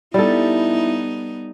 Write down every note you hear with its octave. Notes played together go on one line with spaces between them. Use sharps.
G3 B3 D#4 E4 A4